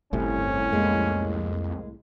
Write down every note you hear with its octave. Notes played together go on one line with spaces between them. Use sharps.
G1 C2 A2 C3 C#4
F2 G#3 A#3